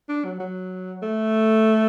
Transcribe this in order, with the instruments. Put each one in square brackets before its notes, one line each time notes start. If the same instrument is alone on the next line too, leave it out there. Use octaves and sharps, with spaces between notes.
[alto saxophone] D4
F#3
F#3
A3